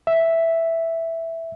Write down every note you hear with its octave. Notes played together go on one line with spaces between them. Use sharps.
E5